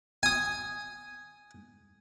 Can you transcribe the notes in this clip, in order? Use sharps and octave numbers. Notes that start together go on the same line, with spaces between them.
G#5 D#6